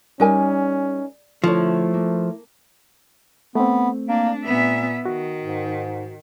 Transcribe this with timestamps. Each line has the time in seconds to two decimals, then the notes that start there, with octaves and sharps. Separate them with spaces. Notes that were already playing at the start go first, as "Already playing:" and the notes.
0.20 G3 C#4 D#4 A#4 G#5
1.44 D3 F3 A3 E4 C#5
1.94 A#3
3.55 A3 B3 C4
4.09 A#3 D4
4.45 A#2 B3 E5
5.06 D#3 F#4
5.42 G#2